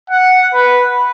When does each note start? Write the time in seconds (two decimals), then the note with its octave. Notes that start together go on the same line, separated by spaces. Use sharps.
0.10 F#5
0.53 B4